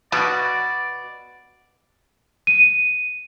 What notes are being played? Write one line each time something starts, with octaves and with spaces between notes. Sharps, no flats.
B2 B3 F#4 D5
D#7